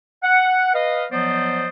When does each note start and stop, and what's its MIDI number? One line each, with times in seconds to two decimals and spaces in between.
0.23 0.70 78
0.74 1.05 71
0.74 1.05 75
0.74 1.05 77
1.12 1.68 53
1.12 1.68 54
1.12 1.68 59
1.12 1.68 72
1.12 1.68 74
1.12 1.68 75